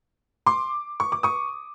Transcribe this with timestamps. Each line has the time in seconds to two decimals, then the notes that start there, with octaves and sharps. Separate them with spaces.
0.46 C6 D6
1.00 C#6
1.12 D6
1.23 C#6 D#6